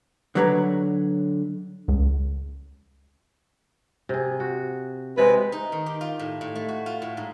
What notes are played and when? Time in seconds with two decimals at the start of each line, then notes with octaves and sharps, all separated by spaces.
0.35 D3 F#3 B4 C#5 A#5
1.88 C#2
4.09 C3 G#4
4.40 F#4
5.18 C3 G#3 G#4 B4
5.52 D#4
5.72 D#3
5.86 G4
6.01 F4
6.19 A2
6.41 A2
6.55 A3
6.68 F#4
6.86 F4
7.02 A2
7.17 G#2